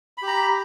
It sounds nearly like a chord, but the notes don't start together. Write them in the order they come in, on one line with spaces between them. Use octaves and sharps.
B5 G4 A#5